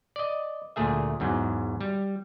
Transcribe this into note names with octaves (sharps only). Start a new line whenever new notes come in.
D5 D#5
D2 A#2 A3 G#4 E5
E2 G#2 F#3
G3